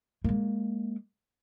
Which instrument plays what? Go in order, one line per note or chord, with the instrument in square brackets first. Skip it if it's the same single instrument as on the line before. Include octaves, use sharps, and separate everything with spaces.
[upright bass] G#3 A#3